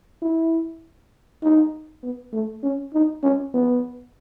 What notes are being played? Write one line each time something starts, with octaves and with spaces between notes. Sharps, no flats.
E4
D#4
B3
A3
C#4
D#4
C#4
B3